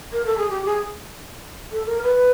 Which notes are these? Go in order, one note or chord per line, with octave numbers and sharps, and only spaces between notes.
A#4
A4
G#4
G4
G#4
A4
A#4
B4